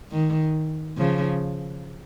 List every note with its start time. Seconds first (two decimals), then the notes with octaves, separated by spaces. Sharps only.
0.12 D#3
0.97 C#3 F3